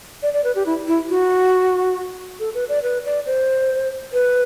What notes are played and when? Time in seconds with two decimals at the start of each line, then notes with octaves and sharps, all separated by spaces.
0.23 D5
0.33 D5
0.44 B4
0.55 G4
0.66 E4
0.87 E4
1.09 F#4
2.40 A4
2.54 B4
2.69 D5
2.83 B4
3.05 D5
3.26 C5
4.13 B4